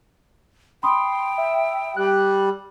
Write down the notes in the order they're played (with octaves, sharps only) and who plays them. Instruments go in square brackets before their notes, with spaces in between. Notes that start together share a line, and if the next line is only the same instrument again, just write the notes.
[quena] G5 [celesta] B5 D#6 [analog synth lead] C6
[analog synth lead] E5
[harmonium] G3 [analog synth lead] F#6